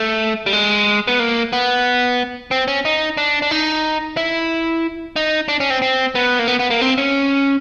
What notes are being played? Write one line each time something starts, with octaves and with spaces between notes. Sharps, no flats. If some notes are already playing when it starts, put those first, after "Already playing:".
Already playing: A3
G3
G#3
B3
A#3
B3
C4
C#4
D#4
D4
D4
D#4
E4
D#4
D4
C#4
C4
C4
B3
A#3
B3
B3
A#3
C4
C#4